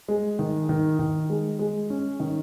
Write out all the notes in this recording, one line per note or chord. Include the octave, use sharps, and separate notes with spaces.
G#3
D#3
D#3
D#3
G#3
G#3
C#4
D#3